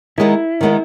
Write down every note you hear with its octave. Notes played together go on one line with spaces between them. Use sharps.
D#3 G#3 B3 D#4 E4
D#3 G#3 B3 D#4